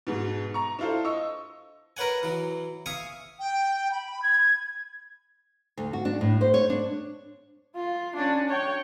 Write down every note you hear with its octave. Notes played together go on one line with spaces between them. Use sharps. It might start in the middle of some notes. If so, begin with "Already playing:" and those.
G#2 B2
A#5 C#6
D4 E4 F4 A4 C5
D#5 C#6 E6
A#4 B4 C#5 F#5 G#5
E3 F#3
E5 F5 G#5 C#6 D#6
G5
B5
G#6
D2
F#4
D4
A2
C5
C#5
D4
F4
C#4 D4
C#5 G5